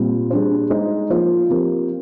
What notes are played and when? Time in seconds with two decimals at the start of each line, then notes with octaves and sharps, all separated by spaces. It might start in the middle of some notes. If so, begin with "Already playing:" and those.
Already playing: A#2 G3 C4
0.30 G3 D4 G#4 C5
0.70 G#3 D#4 G#4 C5
1.09 F3 A#3 F4 C5
1.49 F3 C4 G4 A#4